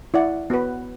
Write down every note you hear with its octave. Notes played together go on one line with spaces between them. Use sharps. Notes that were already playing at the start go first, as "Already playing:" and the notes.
E4 D5 F#5
B3 F#4 B4